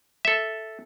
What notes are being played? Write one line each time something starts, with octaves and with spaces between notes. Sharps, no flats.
A4 E5